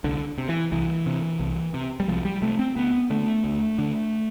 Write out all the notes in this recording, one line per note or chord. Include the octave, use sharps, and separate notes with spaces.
C2 D3
C3
E3
C2 E3
C3
C2
C3
G3
C2 F3
G3
C3 A3
C4
D2 B3
D3 A3
D2
D3